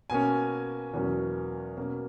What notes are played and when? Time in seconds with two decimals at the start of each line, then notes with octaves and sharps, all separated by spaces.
0.10 B2 A#3 C#4 G#5
0.93 E2 B2 F#3 A#3 C#4
1.77 B2 A#3 C#4